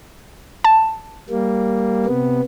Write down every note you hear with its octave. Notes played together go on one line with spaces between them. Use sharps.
A5
G3 A#3
C3 B3